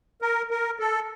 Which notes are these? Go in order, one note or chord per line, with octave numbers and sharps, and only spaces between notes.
A#4
A#4
A4